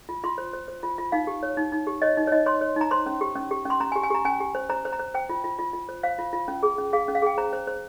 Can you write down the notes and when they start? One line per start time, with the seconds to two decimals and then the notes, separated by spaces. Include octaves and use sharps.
0.09 F4
0.24 F4 C6
0.38 C5
0.53 C5
0.68 C5
0.83 F4
0.98 F4
1.12 D#4 F5
1.27 G4
1.43 C#5
1.57 D#4
1.72 D#4
1.87 G4
2.02 C#5 D#5
2.17 D#4
2.27 C#5
2.32 D#4 D#5
2.46 C#5 C6
2.61 C#5
2.76 D#4 A#5
2.91 C5 C6
3.06 C#4
3.21 G4
3.36 C#4
3.51 G4
3.65 C#4 C6
3.80 C#4 A#5
3.92 G#5
3.96 G4
4.03 G#5
4.10 G4 A#5
4.25 C#4 G#5
4.40 G4
4.55 C5
4.69 C5 A#5
4.85 C5
4.92 A#5
4.99 C5
5.14 C5 G5
5.29 F4
5.44 F4
5.59 F4
5.73 F4
5.89 C5
6.03 C5 F5
6.19 F4
6.33 F4
6.48 C#4
6.63 G#4
6.78 C#4
6.93 G#4 F5
7.08 C#4
7.15 F5
7.22 G#4 G5
7.38 C5 A#5
7.53 C5
7.67 C5